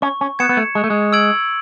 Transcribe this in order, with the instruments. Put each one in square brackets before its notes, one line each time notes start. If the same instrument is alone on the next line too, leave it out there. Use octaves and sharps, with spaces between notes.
[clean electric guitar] C#4 [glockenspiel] C#6
[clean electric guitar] C#4
[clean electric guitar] B3 [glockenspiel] G#6 C#7 E7
[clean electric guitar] B3
A3
[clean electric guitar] G#3 [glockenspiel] C#6
[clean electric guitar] A3
G#3
[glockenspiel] E6 G#6 D7 F#7